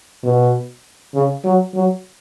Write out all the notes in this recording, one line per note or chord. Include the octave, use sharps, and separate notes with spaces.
B2
C#3
F#3
F#3